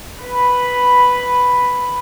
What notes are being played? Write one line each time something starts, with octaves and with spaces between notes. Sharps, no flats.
B4 B5